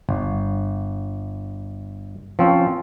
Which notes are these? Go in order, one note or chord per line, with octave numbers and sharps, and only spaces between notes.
G1
F3 C4 C#4